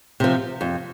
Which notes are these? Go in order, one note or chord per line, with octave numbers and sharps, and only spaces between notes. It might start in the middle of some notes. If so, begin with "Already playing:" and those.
C3 F3
F2